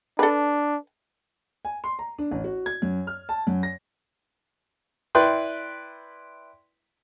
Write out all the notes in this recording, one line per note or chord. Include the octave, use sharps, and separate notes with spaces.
D4 A4 B4
G#5
C6
A#5
D4
A1
F#4
G#6
F#2
F6
A5
F#2
A#6
E4 B4 D5 E5 G5 C6